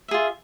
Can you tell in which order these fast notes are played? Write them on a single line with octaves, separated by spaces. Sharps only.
E5 G#4 F4